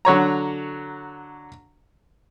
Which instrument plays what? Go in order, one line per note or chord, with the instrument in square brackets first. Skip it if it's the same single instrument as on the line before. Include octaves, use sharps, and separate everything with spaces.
[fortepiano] D3 F#3 C#5 A#5